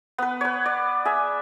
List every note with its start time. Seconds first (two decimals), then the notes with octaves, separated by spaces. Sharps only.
0.18 B3 B4
0.41 B4 C#5
0.66 D5
1.05 G#4 E5